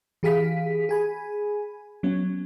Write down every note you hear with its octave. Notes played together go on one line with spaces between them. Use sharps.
E3 G4 G#4 F5 B6
G#4 G#5 B5
F#3 B3 C#4